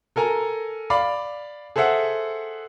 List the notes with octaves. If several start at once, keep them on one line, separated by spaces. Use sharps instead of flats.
A4 A#4 G#5 A#5
D5 F5 B5 D6
G#4 A4 C5 E5 F#5